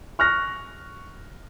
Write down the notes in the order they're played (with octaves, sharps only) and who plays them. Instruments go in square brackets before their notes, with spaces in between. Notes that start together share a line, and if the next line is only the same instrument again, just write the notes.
[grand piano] C#6 F6 F#6 A#6